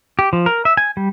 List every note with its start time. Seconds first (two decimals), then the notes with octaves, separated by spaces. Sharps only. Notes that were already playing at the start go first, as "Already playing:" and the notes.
0.19 G4
0.33 F3
0.46 A#4
0.65 E5
0.77 G#5
0.97 G3